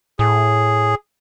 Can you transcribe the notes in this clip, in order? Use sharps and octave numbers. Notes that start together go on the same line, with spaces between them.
A2 G#4